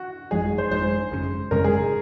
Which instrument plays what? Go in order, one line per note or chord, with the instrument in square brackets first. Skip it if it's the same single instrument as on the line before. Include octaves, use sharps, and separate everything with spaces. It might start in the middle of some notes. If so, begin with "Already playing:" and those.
Already playing: [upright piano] F#4
[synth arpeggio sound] G#1 F#2 F3 G#3 D#4 [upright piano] G#4
[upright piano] C5
[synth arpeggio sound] G#1 F#2 F3 G#3 D#4 [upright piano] C5
[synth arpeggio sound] G#1 F#2 C#3 G#3 C#4
[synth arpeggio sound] G#1 F#2 C#3 G#3 C#4 [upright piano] A#4
[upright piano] G#4